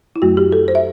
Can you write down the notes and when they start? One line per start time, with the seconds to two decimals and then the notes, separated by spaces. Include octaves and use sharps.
0.16 E4
0.22 F#2 F#3 A3 F#4
0.37 G4
0.52 A4
0.68 C5
0.75 E5